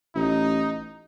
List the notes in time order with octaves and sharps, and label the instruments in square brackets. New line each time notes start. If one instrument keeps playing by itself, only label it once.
[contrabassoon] A1 [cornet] D#4